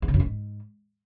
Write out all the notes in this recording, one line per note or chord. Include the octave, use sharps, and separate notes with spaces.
E2
C#3
F#2
A2
G#2